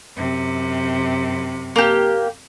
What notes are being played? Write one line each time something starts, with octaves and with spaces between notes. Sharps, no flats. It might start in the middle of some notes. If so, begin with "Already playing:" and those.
F#2 C3
A#3 G4